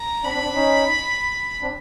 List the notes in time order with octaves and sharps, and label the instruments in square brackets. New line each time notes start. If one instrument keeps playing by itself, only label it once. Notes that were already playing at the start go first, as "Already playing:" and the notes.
Already playing: [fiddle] A#5
[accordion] C4 D4 [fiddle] B5
[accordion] C4 D4
C4 D4
C#4 D#4
C4 D4